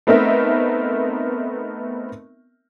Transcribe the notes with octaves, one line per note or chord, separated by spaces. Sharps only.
A3 B3 C4 D#4 A#4 E5